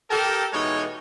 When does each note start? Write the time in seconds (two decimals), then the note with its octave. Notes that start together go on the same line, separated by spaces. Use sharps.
0.10 G4 A4 A#4
0.54 B2 E3 G#3 D#4 C#5